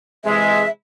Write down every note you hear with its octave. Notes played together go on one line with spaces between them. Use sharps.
C3 E3 G#3 E5